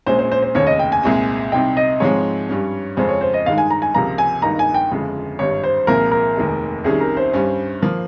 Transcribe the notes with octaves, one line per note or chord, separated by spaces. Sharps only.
A#1 A#2 G#3 C#4 C5
C5
C5
C5
F1 D#2 C#3 C#5
D#5
G5
G#5
C2 A#2 G#3 C4
C2 C3 G3 C4 D#4 G5
D#5
G#2 F3 G#3 C4 C#5
G2 G3 C#4
F2 C#3 G#3 C#4 C5
C#5
C5
D#5
G2 D#3 G#3 D#4 F5
G#5
A#5
G#5
C#2 C3 F3 A#3 A#5
G#5
G#1 G2 D#3 A#3 D#4 A#5
G#5
G5
G1 F2 C#3 G#3
G#1 G2 G3 C#5
C5
C2 A#2 F3 G#3 C4 A#4
A#4
F1 D#2 D#3 G#3
C2 C3 D#3 G3 C#4 G#4
A#4
C5
G2 G3 C#4
F3 A#3